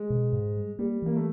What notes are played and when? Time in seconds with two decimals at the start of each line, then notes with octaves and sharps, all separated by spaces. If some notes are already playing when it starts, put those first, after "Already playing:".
Already playing: G#3
0.10 B2
0.32 G#2
0.56 G3
0.79 G3 A#3
1.02 E3 A#3
1.16 A3